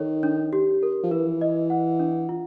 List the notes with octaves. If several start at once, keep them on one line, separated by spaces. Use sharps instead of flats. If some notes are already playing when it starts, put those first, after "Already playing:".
Already playing: D#3 A4 C#5
D4
G4
A#4
F3
E3 B4
D#5
F#5
D4
F4